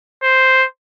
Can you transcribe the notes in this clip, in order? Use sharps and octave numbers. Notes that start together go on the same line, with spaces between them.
C5